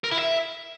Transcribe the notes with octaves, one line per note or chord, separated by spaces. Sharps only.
A#4
E4
E5